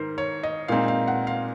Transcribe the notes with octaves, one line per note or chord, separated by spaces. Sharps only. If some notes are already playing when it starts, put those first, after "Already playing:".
Already playing: G#2 D#3 A#4 C5
C#5
D#5
A#2 G#3 C4 D#4 F5
F5
F#5
F5